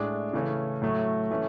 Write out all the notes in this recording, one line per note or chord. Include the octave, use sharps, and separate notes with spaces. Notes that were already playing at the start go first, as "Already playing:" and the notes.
Already playing: A2 G#3 D4
C#3 E3 A3 C#4
A2 F#3 A3
E3 A3 C#4